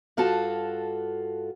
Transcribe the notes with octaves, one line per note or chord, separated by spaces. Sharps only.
G2 F4 F#4 A4 A5